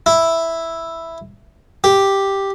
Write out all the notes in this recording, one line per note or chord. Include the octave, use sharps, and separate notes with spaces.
E4
G4